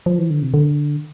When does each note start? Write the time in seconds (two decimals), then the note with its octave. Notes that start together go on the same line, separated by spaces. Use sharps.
0.06 F3
0.18 E3
0.30 D3
0.42 C3
0.54 D3